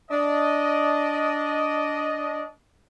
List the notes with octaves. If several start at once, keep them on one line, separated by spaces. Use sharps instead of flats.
D4 D#5